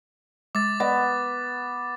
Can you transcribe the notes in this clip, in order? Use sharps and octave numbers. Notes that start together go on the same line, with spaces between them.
G#3 D6 A6
B3 D5 D#5 F#5